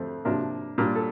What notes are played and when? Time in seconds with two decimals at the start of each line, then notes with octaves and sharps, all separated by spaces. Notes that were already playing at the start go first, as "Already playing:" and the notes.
Already playing: F2 D3 A3 C4
0.25 C3 F3 A#3 D4
0.78 A#2 G3 A#3 D4
0.95 A4